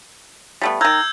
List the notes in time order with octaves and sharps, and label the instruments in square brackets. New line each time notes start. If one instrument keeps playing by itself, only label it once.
[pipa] G3 A3 B3
[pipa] D#3 A#4 [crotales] E6 G6 G#6